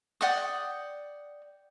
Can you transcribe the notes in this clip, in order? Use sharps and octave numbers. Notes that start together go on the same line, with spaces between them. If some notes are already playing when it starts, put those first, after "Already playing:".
D5 F#5 G5 D#6